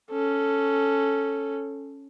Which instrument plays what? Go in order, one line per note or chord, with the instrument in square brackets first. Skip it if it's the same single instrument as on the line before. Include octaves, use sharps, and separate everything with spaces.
[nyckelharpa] C#4 A4